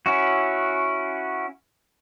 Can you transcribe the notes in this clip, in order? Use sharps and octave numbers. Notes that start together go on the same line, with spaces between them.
C#4 E4 F#4